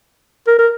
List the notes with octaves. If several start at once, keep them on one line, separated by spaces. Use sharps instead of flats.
A#4
A#4